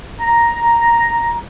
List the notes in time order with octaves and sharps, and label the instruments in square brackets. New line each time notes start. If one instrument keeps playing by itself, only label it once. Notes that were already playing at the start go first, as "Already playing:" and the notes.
[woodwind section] A#5